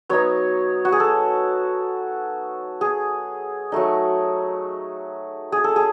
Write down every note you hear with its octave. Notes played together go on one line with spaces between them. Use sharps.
F#3 B3 D#4 C#5
F#4
G#4
A4
G#4
F#3 A3 D#4
G#4
A4
G#4